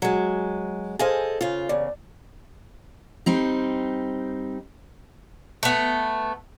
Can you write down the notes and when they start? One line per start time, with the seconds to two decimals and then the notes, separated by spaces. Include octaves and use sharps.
0.02 F#3 G#3
0.99 G#4 A4 C5 D#5 F5 G#5
1.41 C#3 F4
1.69 E2 C#3 D5
3.26 G3 C4 D#4
5.63 A3 B3